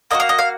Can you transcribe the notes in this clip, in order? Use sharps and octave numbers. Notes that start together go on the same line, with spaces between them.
A#3 D#4 F#4 D#5
F5
D#5
F5